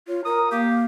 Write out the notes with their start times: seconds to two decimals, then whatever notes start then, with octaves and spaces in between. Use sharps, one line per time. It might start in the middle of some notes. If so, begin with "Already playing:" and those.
0.08 F4 C#5
0.25 A#4 A#5 D#6
0.51 A#3 G4 F5